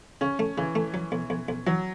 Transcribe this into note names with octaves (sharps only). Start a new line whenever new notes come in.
C#3 C#4
A3
C#3 E3
A3
F#3
B1
B1
B1
E3 F#3